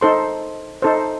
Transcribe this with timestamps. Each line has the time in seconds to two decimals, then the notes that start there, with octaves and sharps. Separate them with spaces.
0.01 D#4 A4 C5 C6
0.82 D#4 A4 C5